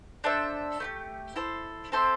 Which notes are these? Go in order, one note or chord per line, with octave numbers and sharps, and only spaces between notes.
D4 A4 C5 E5
A3 E4 G4
E4 A4 C5
C4 A4 C5 E5